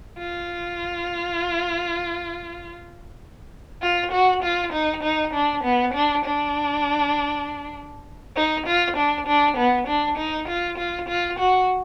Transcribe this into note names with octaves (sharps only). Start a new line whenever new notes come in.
F4
F4
F#4
F4
D#4
D#4
D4
B3
D4
D4
D#4
F4
D4
D4
B3
D4
D#4
F4
F4
F4
F#4